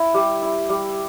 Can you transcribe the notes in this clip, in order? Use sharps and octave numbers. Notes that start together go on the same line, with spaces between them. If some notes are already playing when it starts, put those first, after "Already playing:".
Already playing: E4
G3
E4
G3